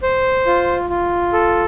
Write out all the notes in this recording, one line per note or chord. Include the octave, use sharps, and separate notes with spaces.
C5
F4
F4
A4